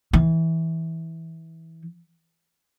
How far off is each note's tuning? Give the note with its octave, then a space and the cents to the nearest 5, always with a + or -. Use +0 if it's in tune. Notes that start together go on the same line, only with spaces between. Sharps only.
E3 -20